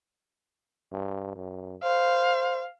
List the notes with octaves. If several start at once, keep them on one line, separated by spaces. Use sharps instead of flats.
G2
F#2
C5 F5